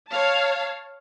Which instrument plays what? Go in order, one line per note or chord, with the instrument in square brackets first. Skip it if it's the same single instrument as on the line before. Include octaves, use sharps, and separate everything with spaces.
[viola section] C#5 F5 A5